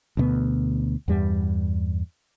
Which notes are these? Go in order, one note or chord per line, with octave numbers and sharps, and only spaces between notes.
D2 B2 A#3 B3
E2 G2 G3